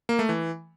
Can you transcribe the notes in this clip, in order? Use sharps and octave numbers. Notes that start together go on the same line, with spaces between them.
A#3
A3
E3